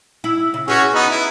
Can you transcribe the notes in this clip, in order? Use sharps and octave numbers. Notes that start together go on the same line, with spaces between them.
E4
C#3
C#4 F#4 G#4 B4
B3 D#4
E4